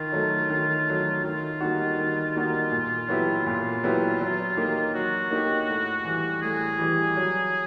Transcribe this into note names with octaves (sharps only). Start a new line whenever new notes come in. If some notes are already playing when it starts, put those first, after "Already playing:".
Already playing: D#3 F4
F#3 A3
D#3
F#3 A3
D#3 F4
G3 A#3 D#4 F#4
D#3
G3 A#3 D#4 F#4
A#2
F#3 B3 E4 G4
A#2 F4
F#3 B3 E4 G4
F#3
A#3 D#4 G4
F#3 F#4
A#3 D#4 G4
A2
E3 G3
A2 G#4
E3 G3
F#3